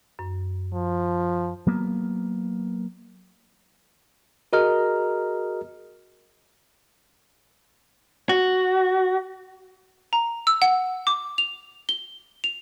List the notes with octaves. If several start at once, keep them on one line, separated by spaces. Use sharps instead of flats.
F#2
F3
F#3 A#3 B3
F#4 G#4 A#4 D#5 A#5 F6
F#4
A#5
E6
F#5
D6
F7
G7
F7